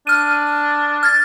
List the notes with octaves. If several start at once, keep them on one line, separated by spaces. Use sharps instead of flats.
D4 F6 D#7
F6 G#6 A6